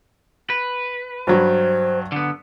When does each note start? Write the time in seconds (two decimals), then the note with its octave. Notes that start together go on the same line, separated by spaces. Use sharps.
0.50 B4
1.27 G2 F#3 C5
2.12 D3 B3